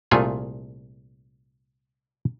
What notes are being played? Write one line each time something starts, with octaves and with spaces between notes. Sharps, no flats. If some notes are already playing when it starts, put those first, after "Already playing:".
C2 A#2 A3 F4 G#4 G#5